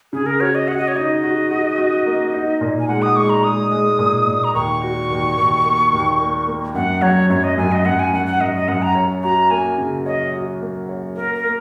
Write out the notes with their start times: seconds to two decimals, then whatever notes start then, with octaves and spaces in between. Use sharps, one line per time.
0.13 C#3 G#4
0.26 A#4
0.40 F#4 C#5
0.55 D#5
0.68 F#4 F#5
0.78 D#5
0.88 C#5
0.96 D#4 D#5
1.24 F#4
1.51 F#4
1.78 F#4
2.06 A#3
2.34 D#4
2.61 A#2
2.80 G#5
2.88 G#3 F#5
3.02 D#6
3.16 G#3 C#6
3.30 A#5
3.43 G#3 D#6
3.71 G#3
3.99 A#2
4.27 A#2
4.44 A#5
4.54 D#2 C#6
4.82 F#4
5.10 D#2
5.37 D#2
5.64 A#3
5.93 D#2
6.20 A#3
6.47 A#3
6.75 F#2 F#5
7.02 F#3 C#5
7.30 F#2 C#5
7.44 D#5
7.58 F#2 G#5
7.72 D#5
7.85 F#2 F#5
7.99 G#5
8.13 F#2 F#5
8.26 F#5
8.41 F#2 D#5
8.54 D#5
8.68 F#2 F#5
8.82 A#5
8.95 C#5
9.23 F#4 A#5
9.51 A#3 G#5
9.78 C#3
10.06 C#5 D#5
10.34 F#4
10.61 A#3
10.89 C#5
11.16 A#3 A#4
11.35 A#4
11.44 A#3